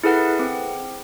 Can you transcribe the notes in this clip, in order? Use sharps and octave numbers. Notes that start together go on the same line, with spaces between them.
E4 G#4 A4 B4 F#5
C4